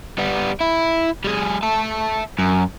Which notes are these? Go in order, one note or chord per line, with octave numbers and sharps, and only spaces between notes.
G3 B3
E4
G3 G#4
E5 A5
F#2